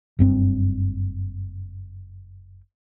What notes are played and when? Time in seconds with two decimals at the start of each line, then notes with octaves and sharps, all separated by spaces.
0.19 F#1 G2 C4